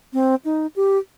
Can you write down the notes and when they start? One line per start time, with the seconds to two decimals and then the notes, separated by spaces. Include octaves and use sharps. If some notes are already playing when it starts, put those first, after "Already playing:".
0.13 C4
0.45 D#4
0.76 G4